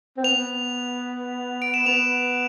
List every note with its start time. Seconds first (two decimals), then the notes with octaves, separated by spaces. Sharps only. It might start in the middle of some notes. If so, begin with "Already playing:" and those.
0.17 C4
0.23 B3 F7
1.62 D7
1.74 E7
1.86 B3 F7